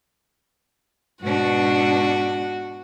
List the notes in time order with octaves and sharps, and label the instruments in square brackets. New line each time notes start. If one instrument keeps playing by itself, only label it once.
[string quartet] G#2 B2 D4 [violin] F#4